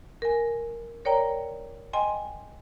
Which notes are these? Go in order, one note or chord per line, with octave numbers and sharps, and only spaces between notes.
A#4 G#5
A#4 C#5 D5 G5 A#5
D#5 G5 G#5 C6